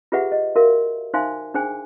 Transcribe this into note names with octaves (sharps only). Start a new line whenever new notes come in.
F4 G4 G#4 B4 E5 F#5
D#5
F#4 A#4 E5 F5
D#4 C5 E5 F5 G#5 C6
D4 G#4 C5 G5 G#5